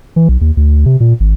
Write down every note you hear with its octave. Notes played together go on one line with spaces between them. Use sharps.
E3
B1
D#2
D2
C3
A#2
G#1